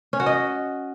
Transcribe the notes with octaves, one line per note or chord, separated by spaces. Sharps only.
C#4
F#4
D#5